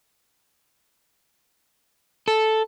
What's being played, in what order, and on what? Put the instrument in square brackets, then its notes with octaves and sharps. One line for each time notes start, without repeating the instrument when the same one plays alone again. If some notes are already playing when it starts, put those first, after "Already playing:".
[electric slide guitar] A4